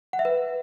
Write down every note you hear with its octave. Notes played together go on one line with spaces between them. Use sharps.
F#5
E5
B4